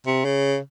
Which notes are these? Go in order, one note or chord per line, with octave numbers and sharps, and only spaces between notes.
C3
C#3